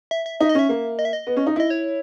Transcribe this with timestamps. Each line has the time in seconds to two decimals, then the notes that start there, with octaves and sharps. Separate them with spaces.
0.11 E5
0.26 E5
0.40 D#4 E5
0.49 D#5
0.55 C#4 E5
0.69 A#3
0.99 D#5
1.05 E5
1.13 D#5
1.27 B3
1.36 C#4
1.46 D#4
1.56 E4 D#5
1.70 C#5